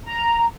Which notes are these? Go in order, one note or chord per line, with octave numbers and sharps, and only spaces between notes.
A#5